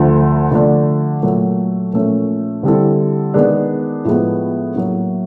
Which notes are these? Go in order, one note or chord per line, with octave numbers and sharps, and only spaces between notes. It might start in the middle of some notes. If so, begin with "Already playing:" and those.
Already playing: D2 D3 F3 A3
D3 F3 A3 D4
A#2 F#3 A3
A#2 F3 A3 C#4
D3 G3 C4 E4 A4
D#3 G#3 B3 D4
A2 F3 G#3 B3
A2 F#3 A#3